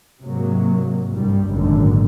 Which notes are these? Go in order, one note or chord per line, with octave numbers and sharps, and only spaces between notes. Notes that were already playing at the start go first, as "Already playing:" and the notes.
G#2 C3 F#3 A#3
C2 G2 G3
G#1 F#2 A#2 D3